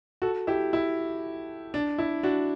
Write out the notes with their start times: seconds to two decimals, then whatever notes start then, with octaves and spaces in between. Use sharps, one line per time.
0.22 F#4 A4
0.47 E4 G4
0.73 E4
1.74 D4
1.98 E4
2.23 D4 F#4